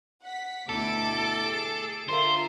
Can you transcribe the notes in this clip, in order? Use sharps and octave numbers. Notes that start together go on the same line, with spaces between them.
F#5 B6
D2 B2 E4 A4 D6 D7
G#4
D3 F4 A#4 C5 E5